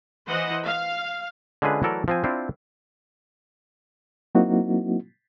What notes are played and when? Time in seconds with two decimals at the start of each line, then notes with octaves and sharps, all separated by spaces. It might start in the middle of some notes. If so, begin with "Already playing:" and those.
0.28 E3 C5 D#5 F#5
0.66 F5
1.62 D3 G#3 C#4 F4 G#4 B4
1.82 E3 F#3 A3 A4 A#4 D5
2.08 F3 C4 G#5
2.24 C4 D4 E4 F4
4.35 F#3 A#3 C4 D#4 E4 F#4